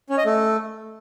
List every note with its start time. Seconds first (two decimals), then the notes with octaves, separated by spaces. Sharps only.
0.10 C#4
0.17 D#5
0.25 A3